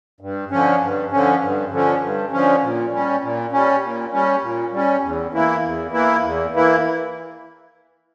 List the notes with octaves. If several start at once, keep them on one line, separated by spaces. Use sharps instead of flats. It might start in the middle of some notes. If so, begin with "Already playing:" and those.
G2
D3 F3 C#4
G2
D3 F3 C#4
G2
D3 F3 C#4
G2
D3 F3 C#4
A#2
G3 C#4
A#2
G3 C#4
A#2
G3 C#4
A#2
G3 C#4
E2
E3 A#3 E4
E2
E3 A#3 E4
E2
E3 A#3 E4